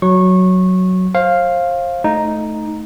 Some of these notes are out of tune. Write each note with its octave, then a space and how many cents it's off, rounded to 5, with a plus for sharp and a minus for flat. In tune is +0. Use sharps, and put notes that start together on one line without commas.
F#3 +0 C#6 -20
C5 +35 F5 +0
A3 -5 D#4 +0